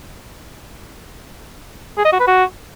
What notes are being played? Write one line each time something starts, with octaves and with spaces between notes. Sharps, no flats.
G#4
D#5
F#4
B4
F#4